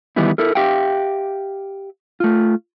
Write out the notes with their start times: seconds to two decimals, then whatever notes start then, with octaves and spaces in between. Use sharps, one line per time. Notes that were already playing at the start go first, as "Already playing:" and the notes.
0.16 D#3 E3 G3 B3 D#4 E4
0.38 E4 A4 A#4
0.55 G4 E5 F5 G5
2.20 A3 F4